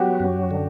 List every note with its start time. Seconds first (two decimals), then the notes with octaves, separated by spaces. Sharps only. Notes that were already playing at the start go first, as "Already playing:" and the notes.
Already playing: F#3 B3 F#4 G4
0.20 F#2
0.51 D3